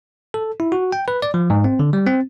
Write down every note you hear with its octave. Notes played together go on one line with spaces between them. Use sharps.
A4
E4
F#4
G5
B4
D5
F3
G#2
C4
D3
G3
C4